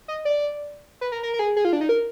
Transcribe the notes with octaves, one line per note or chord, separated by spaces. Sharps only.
D#5
D5
B4
A#4
A#4
A#4
G#4
G#4
F4
D4
D#4
A#4